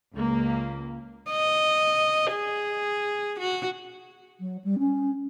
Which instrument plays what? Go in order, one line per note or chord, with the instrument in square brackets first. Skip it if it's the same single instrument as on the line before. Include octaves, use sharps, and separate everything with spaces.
[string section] C#2 A#3
[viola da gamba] D#5
G#4
F#4
[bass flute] F#3
G3
C#4